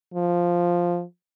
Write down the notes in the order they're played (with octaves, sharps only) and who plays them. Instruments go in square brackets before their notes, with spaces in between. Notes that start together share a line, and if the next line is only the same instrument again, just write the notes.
[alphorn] F3